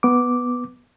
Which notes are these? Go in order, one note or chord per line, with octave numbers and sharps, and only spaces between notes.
B3 D6